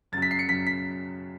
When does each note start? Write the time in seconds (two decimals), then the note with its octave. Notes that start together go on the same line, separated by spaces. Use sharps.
0.12 F#2 C#3 F#3 A6
0.22 B6
0.31 C7
0.39 C#7
0.48 F#2 C#3 F#3 B6
0.67 B6